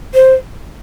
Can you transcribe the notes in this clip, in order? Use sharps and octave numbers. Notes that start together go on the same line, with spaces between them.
C5